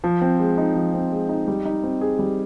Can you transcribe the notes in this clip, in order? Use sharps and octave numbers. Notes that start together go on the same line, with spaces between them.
F3
C4
G#3
D#4
F3
C4
G#3
D#4
G3
D#4
C4
G#4
G3